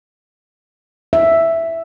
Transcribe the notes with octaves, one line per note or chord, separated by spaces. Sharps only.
E5